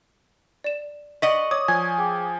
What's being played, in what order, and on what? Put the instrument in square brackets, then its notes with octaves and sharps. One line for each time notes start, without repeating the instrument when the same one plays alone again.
[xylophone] D5 E7
[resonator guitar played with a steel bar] D5 D#5 F#5 [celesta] C#6 [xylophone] B6
[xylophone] C#5 D6 [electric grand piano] D#6
[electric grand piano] F3 G#5 [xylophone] G#6
[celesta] G#4 G5 D6